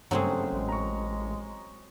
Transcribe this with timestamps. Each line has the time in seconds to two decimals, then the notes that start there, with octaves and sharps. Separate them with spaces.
0.11 F#1 G2 F#3 A3 C4 G#4
0.52 A1 G#3
0.69 A#5 C#6